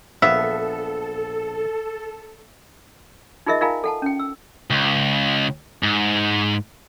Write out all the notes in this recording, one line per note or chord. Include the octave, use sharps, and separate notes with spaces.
A#1 B3 A4 E5 F5
D#4 F4 G#4 A#4 D#5 E5
D#4 F4 A#4 F5 G#5 A#5
A4 F#5 A5
C#4 G5
E6
C#2
G#2